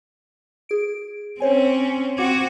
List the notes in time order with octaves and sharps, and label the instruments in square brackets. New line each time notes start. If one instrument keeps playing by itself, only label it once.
[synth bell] G#4 D7
[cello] C4 C#4 [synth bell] C5 C#5 G#5
[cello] C4 F#4 [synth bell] D6 G#6